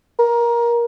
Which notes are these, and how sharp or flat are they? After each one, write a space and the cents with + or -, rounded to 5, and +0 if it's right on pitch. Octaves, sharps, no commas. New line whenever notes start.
A#4 +20